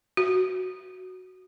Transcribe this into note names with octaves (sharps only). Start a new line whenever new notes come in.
F#4